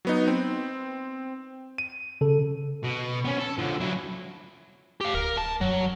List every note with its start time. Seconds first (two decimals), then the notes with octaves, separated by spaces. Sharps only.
0.05 F#3 B3 D#4
0.28 C4
1.78 D#7
2.21 C#3 A4
2.83 B2
3.24 B3 C#4
3.40 A4
3.59 D3 F3
3.80 F#3 E4
5.01 G4 F5
5.15 D1 A#4
5.37 A5
5.61 F#2 F#3